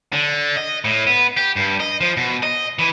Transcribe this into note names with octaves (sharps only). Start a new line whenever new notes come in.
D3
D#5
A2
B3
G4
G2
D#5
F3
B2
D#5
E3